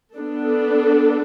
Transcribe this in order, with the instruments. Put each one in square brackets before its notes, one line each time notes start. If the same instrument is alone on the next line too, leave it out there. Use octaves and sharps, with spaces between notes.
[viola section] B3 D4 A4